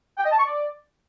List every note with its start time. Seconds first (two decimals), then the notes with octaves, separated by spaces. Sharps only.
0.18 G5
0.25 D#5
0.32 A5
0.38 C#6
0.45 D5